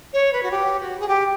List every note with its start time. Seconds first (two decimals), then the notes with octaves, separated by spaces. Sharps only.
0.13 C#5
0.32 B4
0.42 F#4
0.51 G4
0.79 F#4
0.99 G#4
1.08 G4